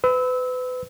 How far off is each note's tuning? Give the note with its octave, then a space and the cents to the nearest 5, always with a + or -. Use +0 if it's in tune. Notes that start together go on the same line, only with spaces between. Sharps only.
B4 +35 E6 -25